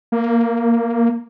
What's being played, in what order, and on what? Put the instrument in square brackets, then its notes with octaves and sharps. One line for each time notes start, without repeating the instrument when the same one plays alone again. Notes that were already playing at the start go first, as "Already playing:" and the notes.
[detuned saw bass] A#3